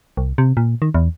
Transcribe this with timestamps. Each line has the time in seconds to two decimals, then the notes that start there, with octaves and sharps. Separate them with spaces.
0.17 C2
0.38 C3
0.57 A#2
0.82 D#3
0.94 E2